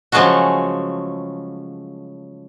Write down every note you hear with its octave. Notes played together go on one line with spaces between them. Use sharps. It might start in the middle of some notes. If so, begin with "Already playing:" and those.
C#3 F3 F#3 G#3 A3 F#4